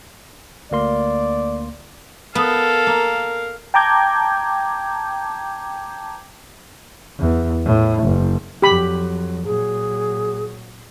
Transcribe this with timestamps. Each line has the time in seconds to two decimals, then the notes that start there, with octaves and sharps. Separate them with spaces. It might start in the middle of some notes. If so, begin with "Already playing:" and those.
0.71 D2 A#3 D5 C6
2.35 B3 A4 A#4 F5
2.87 A#3
3.74 G5 A5 A#5 D6 G6 G#6
7.19 E2
7.65 A2
8.03 F#1
8.62 F2 F#3 G4 B5
9.45 A#2 F#3 G#4